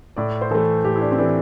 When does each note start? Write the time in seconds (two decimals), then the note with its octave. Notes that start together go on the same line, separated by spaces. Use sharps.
0.16 A2 D5
0.41 C5
0.51 E3 A3 A4
0.85 A2 G4
0.96 E4
1.01 D4
1.12 C4
1.18 E3 A3 D4